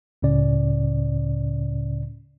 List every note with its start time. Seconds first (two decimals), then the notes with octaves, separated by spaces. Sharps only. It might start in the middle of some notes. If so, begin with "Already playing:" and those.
0.22 C#2 A2 C#3 C#4 D5